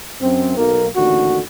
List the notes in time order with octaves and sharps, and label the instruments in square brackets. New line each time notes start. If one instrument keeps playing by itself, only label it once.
[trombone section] F#2 C4
B1 A#3
A1 D#2 D3 F#4